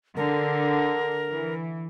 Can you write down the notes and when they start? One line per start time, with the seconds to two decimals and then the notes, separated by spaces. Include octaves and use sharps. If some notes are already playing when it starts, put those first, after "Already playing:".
0.16 D3 A#4
1.30 E3